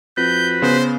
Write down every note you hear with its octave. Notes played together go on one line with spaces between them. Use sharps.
F2 F#4 B4 G6
C#3 B3 C5